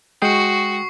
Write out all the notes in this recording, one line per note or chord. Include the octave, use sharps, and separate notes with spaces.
G#3 F#4 G5 C#6 D#6 C7